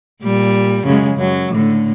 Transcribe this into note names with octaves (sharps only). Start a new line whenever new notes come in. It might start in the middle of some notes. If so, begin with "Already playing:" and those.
A#2 G3
F#2 C#3 G#3
F#2 F#3
A2 D3